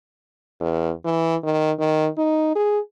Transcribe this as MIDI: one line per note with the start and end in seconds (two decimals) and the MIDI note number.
0.60 0.91 40
1.05 1.35 52
1.43 1.71 51
1.79 2.08 51
2.17 2.50 63
2.55 2.79 68